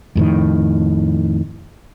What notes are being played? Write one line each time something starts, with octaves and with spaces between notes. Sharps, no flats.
F2 A2 D#3